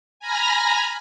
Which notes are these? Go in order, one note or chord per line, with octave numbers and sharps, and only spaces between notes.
G#5 A#5 B5 F6 A#6